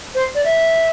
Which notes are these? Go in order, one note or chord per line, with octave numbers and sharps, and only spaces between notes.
C5
D5
E5